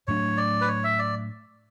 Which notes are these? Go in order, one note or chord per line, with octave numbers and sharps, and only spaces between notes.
A2 F#3 A3 D4 C#5
D5
B4
C#5
E5
D5